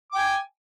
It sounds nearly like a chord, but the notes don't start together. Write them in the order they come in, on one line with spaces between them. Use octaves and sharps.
D6 G5 G#5